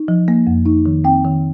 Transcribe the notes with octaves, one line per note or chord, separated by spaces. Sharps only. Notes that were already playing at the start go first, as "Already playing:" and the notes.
Already playing: D#4
F3
A#3
F2
D#4
D#3
C4 G5
D#3